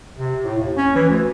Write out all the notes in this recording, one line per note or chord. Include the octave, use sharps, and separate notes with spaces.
C3
A2
D#2
C#4
E3
D2